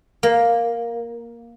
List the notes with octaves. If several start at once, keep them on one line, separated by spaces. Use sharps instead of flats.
A#3